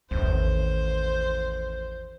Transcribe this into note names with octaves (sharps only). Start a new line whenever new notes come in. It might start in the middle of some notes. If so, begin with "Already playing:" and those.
A1 E2 D#3 C5